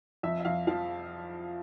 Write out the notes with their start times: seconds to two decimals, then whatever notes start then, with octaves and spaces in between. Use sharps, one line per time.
0.23 F2 E5
0.40 E5
0.45 F2 F5
0.67 F3 F5